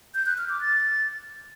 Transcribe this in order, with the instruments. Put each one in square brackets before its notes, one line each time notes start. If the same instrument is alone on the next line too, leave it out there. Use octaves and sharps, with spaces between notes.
[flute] G6
F#6
F6
D6
A6